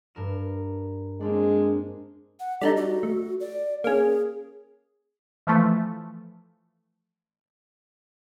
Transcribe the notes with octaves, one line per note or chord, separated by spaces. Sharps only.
G2 A#4 E7
G#3 A#3 C4 D4
F#5
G3 D4 D#4 A4
F#4
A3
D5
A#3 C#4 G#4
E3 F3 A3